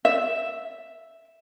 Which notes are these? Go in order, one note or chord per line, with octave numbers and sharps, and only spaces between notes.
E5